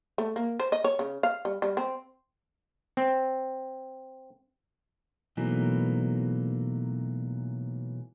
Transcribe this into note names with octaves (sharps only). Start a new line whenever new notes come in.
A3
A#3
C5
D#5
C#5
C#3
F5
G3
G3
C4
C4
B2 E3 F#3 A3 A#3 D#4